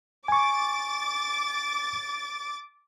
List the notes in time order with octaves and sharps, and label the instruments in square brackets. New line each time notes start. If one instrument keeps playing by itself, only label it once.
[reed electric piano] G#5 C#6 [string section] D6 A6